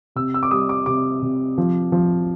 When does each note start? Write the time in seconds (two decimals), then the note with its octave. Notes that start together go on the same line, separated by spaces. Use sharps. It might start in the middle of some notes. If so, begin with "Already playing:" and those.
0.16 C3 E6
0.34 E6
0.43 D6
0.51 G3 D#6
0.69 D6
0.86 C3 D6
1.22 C3
1.58 F3
1.92 F3